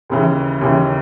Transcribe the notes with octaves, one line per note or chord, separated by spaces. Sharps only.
D#2 C#3 E3
D#2 C#3 E3